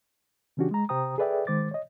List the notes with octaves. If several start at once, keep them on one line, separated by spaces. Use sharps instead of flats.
C#3 E3 C#4 D4 F#4 G4
G#3 A#5
C3 G4 C5 G5 A#5 D#6
G#4 A4 B4 D5 E5 G5
D#3 G#3 C5 D6 A6
C#5 D#5